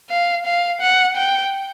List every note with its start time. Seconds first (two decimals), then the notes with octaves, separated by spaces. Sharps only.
0.10 F5
0.46 F5
0.81 F#5
1.17 G5